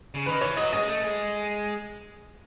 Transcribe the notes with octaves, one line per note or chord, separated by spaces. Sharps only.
C#3
D#3 B4
E3 C#5
F#3 D#5
G#3 D#5
A3
G#3